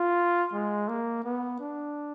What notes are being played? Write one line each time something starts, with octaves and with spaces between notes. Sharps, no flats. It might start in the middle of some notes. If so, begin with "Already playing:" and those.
Already playing: F4
G#3
A#3
B3
D4